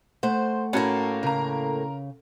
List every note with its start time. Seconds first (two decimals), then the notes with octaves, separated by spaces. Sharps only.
0.23 A3 C5 F#5
0.73 A2 A#3 C#4 F#4 A4
1.23 C#3 A#4 A#5